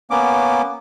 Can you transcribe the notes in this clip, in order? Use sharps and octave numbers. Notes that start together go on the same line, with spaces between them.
A#3 B3 C#4 D6